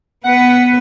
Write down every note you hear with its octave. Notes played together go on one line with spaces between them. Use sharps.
B3 B4 F#5